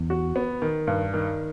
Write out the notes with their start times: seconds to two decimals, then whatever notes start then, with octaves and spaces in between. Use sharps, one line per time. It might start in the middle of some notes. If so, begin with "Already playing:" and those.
Already playing: E2
0.10 F#4
0.36 B3
0.62 D#3
0.87 G2
1.14 D#3